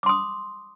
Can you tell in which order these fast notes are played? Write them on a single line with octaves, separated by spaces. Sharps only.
D6 C6 D#6